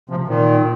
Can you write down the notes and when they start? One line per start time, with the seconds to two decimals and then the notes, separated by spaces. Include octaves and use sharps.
0.09 C3 F3
0.28 A#2 D#3